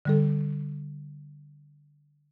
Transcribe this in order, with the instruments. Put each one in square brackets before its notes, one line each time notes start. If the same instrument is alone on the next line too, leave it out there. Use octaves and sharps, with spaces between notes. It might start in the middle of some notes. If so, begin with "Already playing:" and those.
[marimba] D3 G3 A4